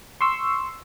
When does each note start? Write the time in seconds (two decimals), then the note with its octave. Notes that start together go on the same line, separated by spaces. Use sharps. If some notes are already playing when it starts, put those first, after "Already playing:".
0.21 C6 C#6 E6